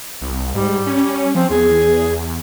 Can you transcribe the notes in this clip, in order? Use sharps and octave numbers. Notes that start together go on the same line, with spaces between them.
C2
G#2 G3
C#4
F3 C4
E2 G#4